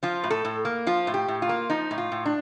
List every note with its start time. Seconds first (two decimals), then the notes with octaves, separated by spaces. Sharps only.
0.03 F3 F4
0.24 A2
0.30 A4
0.45 A2
0.65 A#3
0.87 F3 F4
1.07 A2
1.14 G4
1.28 A2
1.42 F4
1.49 A#3
1.70 F3 D#4
1.91 A2
1.98 F4
2.12 A2
2.26 D4